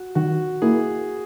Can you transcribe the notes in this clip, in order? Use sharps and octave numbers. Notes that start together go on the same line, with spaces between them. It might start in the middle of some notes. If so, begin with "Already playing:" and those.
Already playing: F#4
D#3 F#4
A#3 E4 G#4